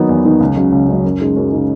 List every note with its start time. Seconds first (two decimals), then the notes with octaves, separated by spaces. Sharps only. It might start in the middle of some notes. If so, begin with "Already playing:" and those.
Already playing: D#3 F#3 B3 D#4
0.09 E2
0.25 D#3 F#3 B3 D#4
0.40 C#2
0.56 C#3 F#3
0.72 C#2
0.88 C#3 F#3
1.04 F#2
1.20 C#3 G#3 D#4
1.36 F#2
1.52 C#3 G#3 D#4